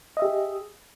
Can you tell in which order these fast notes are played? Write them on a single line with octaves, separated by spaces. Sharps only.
D#5 E5 G4 G#4